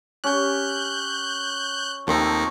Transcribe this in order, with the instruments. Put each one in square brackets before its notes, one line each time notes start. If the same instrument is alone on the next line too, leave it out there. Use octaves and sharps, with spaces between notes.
[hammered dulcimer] C#4 G4 [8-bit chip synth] F#6 G6
[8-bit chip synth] D#2 D#3 D#4 [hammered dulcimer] F3 A3 C4